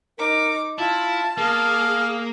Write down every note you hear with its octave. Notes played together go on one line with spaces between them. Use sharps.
D#4 A#4 D6
E4 F4 A5
A#3 G#4 F5